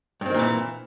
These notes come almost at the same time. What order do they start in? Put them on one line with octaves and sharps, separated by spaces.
G2 C4 D#3 A#2 E3